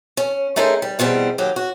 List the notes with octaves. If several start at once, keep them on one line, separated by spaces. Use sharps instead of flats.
C#4
A3 C#4 D#4 G#4 A#4 C5
G3
E2 B2 G3 C4
D#2 F#3 G4
F#4